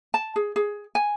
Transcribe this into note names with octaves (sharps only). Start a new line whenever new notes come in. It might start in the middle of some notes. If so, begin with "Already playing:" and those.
A5
G#4
G#4
G#5